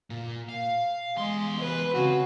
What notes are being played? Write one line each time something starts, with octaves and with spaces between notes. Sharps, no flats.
A#2
F5
E2 G#3 C6
B4
C#3 C4 F#4